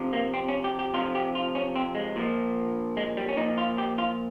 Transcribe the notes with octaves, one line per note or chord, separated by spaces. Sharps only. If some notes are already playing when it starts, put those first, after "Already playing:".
Already playing: C3 F3
A#3
C4
C#4
G4
G4
C3 F3 F4
G4
F4
C#4
C4
G#3
A#2 F3
G#3
G3
C#4
A#2 F3 D#4
F4
G4
F4